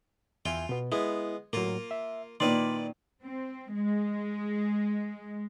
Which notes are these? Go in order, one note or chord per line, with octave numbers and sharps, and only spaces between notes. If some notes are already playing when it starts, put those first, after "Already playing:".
E2 F4 E5 G5 G#5
B2 B3
G#3 B3 E4
A2 F#3 A#3 F4
E5
A#2 D#3 E4 B4 D5 C6
C4
G#3